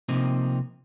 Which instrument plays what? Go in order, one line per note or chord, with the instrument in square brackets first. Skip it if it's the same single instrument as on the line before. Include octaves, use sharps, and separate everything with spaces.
[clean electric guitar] C3 F3 A#3 C4 D#4